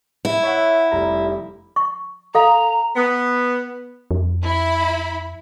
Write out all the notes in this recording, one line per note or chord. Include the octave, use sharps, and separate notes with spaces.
E4
C#5 E5 F#5
F1 G3 A#5
C#6
A4 F5 A#5
B3
F2
E4 B5